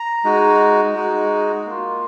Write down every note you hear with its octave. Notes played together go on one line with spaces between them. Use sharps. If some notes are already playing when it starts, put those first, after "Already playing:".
Already playing: A#5
G#3 D#4 F#4
G#3 D#4 F#4
A#3 F4